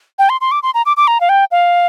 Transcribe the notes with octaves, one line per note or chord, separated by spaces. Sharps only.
G5
C6
C6
D6
C6
A#5
D6
D6
A#5
F5
G5
F5